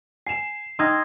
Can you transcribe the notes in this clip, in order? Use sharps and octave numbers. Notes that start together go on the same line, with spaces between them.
G#5 C7 E7
D#4 G5 C6 E6 F6 G#6 A#6